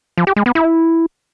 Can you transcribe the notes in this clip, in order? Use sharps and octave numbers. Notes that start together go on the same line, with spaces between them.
F3
G4
G#3
B3
E4